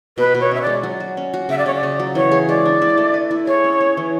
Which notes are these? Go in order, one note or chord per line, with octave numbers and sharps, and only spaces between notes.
B2 B4
B2
C#5
C#4 E5
G#3 D5
F#3
F#4
C#4
F#4
C#3 E5
D5
C#3 C#5
D5
C#3
F#3
E3 C#5
G#4
G#3 D5
D4
E4
A3
B4
E4
G#4 C#5
C#4
C#4
E3